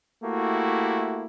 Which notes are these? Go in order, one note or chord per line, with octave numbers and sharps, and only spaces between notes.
A3 A#3 E4 F#4 G4